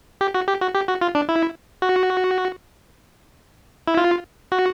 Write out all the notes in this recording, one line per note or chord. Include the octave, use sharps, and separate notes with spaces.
G4
F#4
G4
F#4
G4
F#4
F4
D4
E4
F#4
E4
F4
F#4